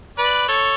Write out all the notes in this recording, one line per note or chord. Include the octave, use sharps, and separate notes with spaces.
B4 D5
A4 C#5